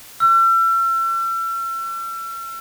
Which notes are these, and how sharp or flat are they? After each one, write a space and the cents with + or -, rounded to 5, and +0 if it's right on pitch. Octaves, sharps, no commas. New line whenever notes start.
E6 +40